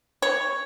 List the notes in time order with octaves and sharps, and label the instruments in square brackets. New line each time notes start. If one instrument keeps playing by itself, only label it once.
[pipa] C#5